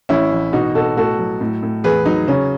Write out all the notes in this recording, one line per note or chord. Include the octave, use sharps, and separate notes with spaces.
A1 C#4 E4
A1
B2 D#4 F#4
B2 F#4 A4
A2 F#4 A4
F#3
A2
A2
E2 G#4 B4
F#3 D#4
C#3 C#4